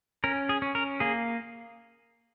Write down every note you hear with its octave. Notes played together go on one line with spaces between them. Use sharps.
C#4 A#4
G#4
C#4
A#4
A#3 G#4